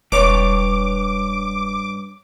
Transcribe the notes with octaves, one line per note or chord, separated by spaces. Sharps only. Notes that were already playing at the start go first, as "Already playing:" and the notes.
E1 G2 B4 C#5 D6